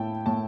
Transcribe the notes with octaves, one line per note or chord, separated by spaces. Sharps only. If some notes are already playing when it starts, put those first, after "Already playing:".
Already playing: A2 E4 G5 A5
A2 A5